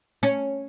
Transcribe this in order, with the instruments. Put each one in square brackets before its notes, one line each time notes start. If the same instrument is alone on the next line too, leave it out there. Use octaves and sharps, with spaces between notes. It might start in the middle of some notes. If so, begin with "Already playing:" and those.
[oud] C#4